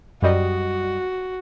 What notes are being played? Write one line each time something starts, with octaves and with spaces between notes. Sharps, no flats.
F#2 G3 F#4 D#5